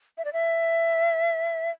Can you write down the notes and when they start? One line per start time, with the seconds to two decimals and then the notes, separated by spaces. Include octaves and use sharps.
0.18 E5
0.25 D5
0.33 E5